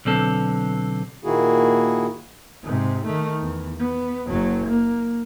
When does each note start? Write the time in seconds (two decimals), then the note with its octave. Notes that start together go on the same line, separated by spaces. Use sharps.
0.05 B1 D3 C4 A4
1.24 A#2 D#3 A#3 E4 F#4 G#4
2.63 G#2 C3
3.06 D#3 A3
3.41 E2
3.80 B3
4.27 F#1 F#3
4.68 A#3